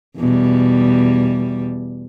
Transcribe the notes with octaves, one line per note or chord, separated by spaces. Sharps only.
E2 B2 G3